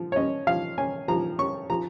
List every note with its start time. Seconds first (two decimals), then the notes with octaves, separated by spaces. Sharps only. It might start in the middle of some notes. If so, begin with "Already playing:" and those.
Already playing: F3
0.12 C#5
0.16 C#4 D#5
0.47 F3 F5
0.78 C#4 G#5
1.08 F3 A#5
1.39 C#4 C#6
1.70 F3 A#5